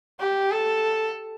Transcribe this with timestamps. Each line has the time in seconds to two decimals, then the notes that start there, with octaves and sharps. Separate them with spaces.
0.19 G4
0.51 A4